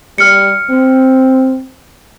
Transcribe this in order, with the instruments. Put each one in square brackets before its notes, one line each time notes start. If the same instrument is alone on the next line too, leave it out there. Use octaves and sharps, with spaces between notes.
[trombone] G3 [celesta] F6 C#7
[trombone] C4